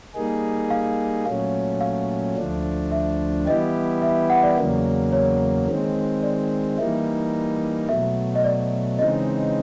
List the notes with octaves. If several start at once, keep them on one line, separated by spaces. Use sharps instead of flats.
G3 A#3 D#4 G#4
F5
A#2 F#3 A3 C#4 F5
F5
D2 D3 F3 A3 D4
E5
E3 G3 B3 E4 G4 D#5
E5
F#5
D5
E2 C#3 F#3 A#3
C#5
D#3 G#3 C4
D5
E3 G3 A#3 D#4 E5
B2 F#3 A3 E5
D#5
D5
C#3 E3 G#3 C4 D#4 D#5